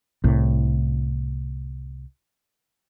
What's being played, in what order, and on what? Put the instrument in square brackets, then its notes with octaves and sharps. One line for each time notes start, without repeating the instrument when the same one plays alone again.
[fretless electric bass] C2 A2